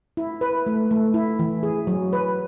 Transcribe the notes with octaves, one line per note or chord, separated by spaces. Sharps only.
E4
B4
A3
A3
E4
E3
G#4
F#3
B4